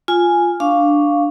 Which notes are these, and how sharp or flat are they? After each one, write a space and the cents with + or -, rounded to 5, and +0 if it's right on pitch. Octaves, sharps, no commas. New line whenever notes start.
F4 +0 G#5 +0
D4 +0 F5 +0 C#6 +5